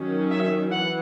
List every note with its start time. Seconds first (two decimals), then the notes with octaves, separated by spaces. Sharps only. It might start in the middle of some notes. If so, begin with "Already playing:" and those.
Already playing: D#3 F#3 C#4
0.31 E5
0.70 E3 F#5